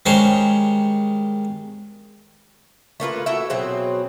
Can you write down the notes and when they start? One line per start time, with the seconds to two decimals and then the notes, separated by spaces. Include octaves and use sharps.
0.06 D#3 G3 G#3 C#4 C5 C#5
3.00 A3 A#3 F4 B4
3.26 E4 F#4 A4 E5
3.50 B2 F#3 C4 G#4